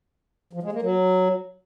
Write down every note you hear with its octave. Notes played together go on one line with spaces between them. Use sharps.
F3
G#3
A#3
F#3